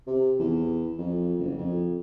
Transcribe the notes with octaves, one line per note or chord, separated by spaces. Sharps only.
C3
E2
F2
F#1
F2